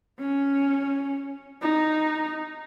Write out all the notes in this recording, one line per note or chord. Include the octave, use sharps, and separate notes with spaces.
C#4
D#4